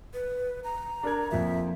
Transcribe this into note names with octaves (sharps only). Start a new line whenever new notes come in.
B4
A#5
D4 A#4 G#6
F2 F3 A#3 E5